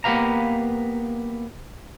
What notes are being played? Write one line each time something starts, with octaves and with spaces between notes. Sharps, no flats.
A#3 B3 G4 B4 F5 A#5